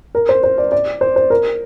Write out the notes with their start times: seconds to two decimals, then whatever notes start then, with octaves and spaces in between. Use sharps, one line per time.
0.15 A#4
0.29 C5
0.43 C5
0.58 D5
0.72 D5
1.01 C5
1.16 C5
1.30 A#4